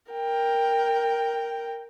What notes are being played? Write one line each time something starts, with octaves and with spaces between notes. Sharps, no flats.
A#4 G5